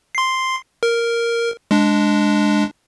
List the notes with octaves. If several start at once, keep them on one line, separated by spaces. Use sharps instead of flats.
C6 C7
A#4
G#3 D4